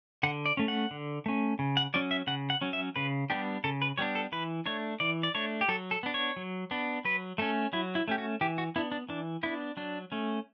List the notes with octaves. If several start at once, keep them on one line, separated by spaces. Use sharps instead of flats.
D3 F#5
D5
A3 C#4
F#5
D3
A3 C#4
C#3
F#5
F#3 C#4 D5
E5
C#3 F#5
F#5
F#3 C#4
E5
C#3 B4
G3 B3 D4 G4
C#3 A4
B4
G3 B3 D4 C#5
A4
E3 B4
A3 D4 C#5
E3 D5
D5
A3 D4 C#5
G4
F#3 A4
A4
B3 D4
C#5
F#3
B3 D4
F#3 B4
A3 C#4 A4
F#3 E4
E4
A3 C#4 G4
F#4
E3 G4
F#4
B3 D4 E4
D4
E3 D4
B3 D4 E4
F#3 D4
A3 C#4